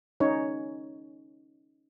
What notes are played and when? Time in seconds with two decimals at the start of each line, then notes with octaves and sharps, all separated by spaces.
0.20 C#4 D#4 C#5